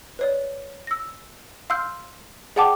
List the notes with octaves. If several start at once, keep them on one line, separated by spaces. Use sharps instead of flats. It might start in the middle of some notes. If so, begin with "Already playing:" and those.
B4 C#5 D5
E6 A#6
F5 C6 E6 F6 G6
G#4 D5 F#5 G5 A5 D6